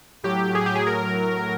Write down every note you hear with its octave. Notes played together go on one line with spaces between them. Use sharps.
A2 F#3 G4
G#4
G4
G#4
A#4